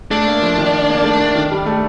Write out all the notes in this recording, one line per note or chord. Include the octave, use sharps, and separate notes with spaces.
A3 D4
A#3
F3
D#3
A#3
A3
D#3
D#3
G3
A3